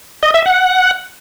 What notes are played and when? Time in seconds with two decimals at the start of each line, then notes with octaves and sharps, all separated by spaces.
0.23 D#5
0.34 E5
0.46 F#5